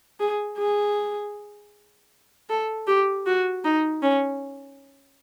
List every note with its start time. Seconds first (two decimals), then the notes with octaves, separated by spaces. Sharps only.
0.20 G#4
0.58 G#4
2.50 A4
2.87 G4
3.27 F#4
3.64 D#4
4.02 C#4